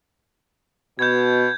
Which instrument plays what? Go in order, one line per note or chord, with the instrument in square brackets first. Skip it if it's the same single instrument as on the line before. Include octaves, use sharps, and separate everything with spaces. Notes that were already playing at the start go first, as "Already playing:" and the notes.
[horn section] B2 [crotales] G6 G#6